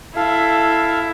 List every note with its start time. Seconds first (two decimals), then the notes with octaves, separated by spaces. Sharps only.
0.16 E4 A4 F5